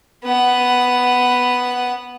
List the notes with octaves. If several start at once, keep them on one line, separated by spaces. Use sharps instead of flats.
B3 F#5